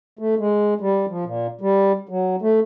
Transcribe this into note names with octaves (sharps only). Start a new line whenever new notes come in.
A3
G#3
G3
F3
A#2
G3
F#3
A3